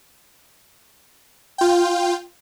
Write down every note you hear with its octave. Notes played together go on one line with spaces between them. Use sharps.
F4 G5